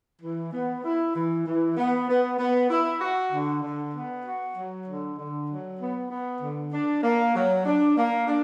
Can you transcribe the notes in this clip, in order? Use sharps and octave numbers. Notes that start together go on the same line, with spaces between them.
E3
B3
E4
E3
E3
B3
B3
B3
E4
F#4
D3
D3
B3
F#4
F#3
D3
D3
F#3
B3
B3
D3
D4
A#3
F#3
D4
A#3
D4